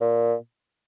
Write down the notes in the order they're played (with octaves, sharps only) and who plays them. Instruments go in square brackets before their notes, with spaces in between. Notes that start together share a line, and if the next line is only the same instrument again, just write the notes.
[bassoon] A#2